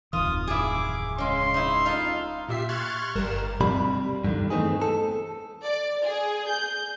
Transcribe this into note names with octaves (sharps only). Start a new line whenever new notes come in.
D1 F2 D#3 F4 D#6
E4 G#4 D6
C#3 G#3 C6
D#4 E4
D#4 F4 A4
A#2 G4 E5 C7
C6 C#6 F6 F#6 G#6 A6
G1 G2 G3 A#4 E7
G2 C3 G3 B5
G2 B2 D3 D#3
E3 A3 B3 C4 D#4 G#4
A4
D5
G#4
G6